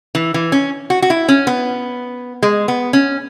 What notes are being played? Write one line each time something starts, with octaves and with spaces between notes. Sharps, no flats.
E3
E3
C#4
F#4
F#4
E4
C#4
B3
G#3
B3
C#4